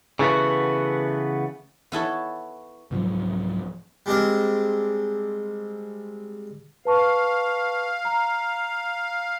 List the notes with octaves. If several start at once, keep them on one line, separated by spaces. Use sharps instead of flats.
C#3 E3 A3 B3 F#4
B3 E4 A4 C#5
C2 G#2 F3 F#3
G3 G#3 C4 D4 A#4
B4 F5 A5 C#6
A#5